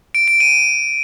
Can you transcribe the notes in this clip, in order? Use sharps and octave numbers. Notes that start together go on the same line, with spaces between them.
D7
D7
D#7